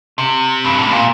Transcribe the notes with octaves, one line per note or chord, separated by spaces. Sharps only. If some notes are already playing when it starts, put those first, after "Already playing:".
C3
G2
A2
A#2